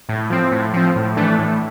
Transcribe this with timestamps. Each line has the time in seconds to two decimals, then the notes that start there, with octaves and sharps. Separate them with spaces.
0.09 A2
0.30 F3 C4
0.52 A2
0.73 F3 C4
0.96 A2
1.17 E3 A3 D4
1.39 A2